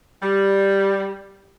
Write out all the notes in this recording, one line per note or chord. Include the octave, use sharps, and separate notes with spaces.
G3